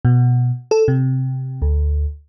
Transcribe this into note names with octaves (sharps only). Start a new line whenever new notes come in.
B2
A4
C3
D2